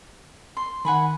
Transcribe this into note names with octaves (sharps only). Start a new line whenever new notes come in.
C6
D#3 F#5 G#5 B5